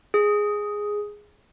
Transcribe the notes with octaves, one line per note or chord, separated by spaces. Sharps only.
G#4